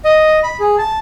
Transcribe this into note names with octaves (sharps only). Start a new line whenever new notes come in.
D#5
B5
G#4
A5